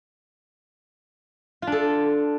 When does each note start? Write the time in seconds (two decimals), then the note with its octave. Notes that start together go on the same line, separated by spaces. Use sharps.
1.62 F4
1.67 D4
1.72 A4